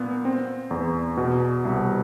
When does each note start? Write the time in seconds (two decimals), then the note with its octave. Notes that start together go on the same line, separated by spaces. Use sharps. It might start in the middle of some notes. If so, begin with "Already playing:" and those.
Already playing: A#2 B3
0.25 C4
0.71 E2
1.17 B2
1.65 C2